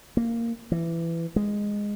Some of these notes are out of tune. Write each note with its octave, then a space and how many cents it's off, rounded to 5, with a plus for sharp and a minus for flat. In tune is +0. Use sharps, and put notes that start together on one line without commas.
A#3 -10
E3 +20
G#3 -10